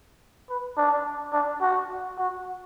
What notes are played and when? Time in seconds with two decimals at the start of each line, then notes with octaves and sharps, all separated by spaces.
0.50 B4
0.77 D4
1.33 D4
1.61 F#4
2.18 F#4